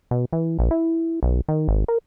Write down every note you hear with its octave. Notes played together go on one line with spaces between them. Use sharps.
B2
E3
A#1
E4
B1
D#3
G#1
A#4